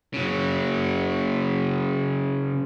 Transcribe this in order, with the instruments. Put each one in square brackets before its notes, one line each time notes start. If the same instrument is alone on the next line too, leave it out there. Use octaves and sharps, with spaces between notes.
[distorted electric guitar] C#3 F#3